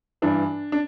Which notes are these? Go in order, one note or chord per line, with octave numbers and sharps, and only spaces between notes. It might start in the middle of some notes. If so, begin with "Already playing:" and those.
G2 E3 D4
D4